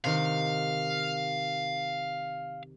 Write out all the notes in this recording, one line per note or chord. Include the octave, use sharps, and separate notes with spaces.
C3 D#3 F5